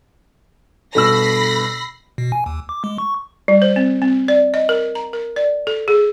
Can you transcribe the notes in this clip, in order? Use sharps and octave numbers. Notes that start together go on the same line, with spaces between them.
G2 B2 A4 B5 E6 A#6 C7
B2
G#5
D#2
D6
G#3
C#6
G3
C5
C4
C4
D5
D#5
A#4
A#5
A#4
D5
A4
G#4